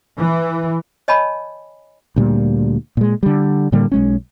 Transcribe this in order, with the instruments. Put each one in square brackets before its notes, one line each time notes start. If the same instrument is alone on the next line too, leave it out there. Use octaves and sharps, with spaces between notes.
[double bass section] E3
[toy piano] C#5 D#5 G#5 A5 B5
[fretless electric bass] D2 A#2 G3
A#2 G#3
D3 G3
A2 D3 G3 A#3
B1 G#3 C#4